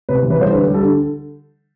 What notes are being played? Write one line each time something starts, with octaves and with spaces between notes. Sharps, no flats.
C3 B4
E3
B4
G3 C5
D3 B4
G3
A4
D3